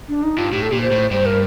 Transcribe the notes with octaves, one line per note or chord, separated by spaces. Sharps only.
D4
D#4
G2 F4
A2 G4
A4
A#2 G4
C5
A2
G2 C5
A#4